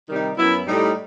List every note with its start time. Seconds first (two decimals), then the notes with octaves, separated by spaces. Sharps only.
0.08 C3 D#3 G3 D#4
0.37 F#2 F#3 B3 E4
0.66 A2 G3 D#4